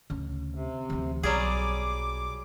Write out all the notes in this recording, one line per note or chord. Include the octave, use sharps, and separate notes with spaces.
D2 C#3
C3
D2 E3
B1 F#3 G3 G#4 D6